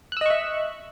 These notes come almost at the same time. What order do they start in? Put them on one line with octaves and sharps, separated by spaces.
F#6 E6 D#5 C#6 E5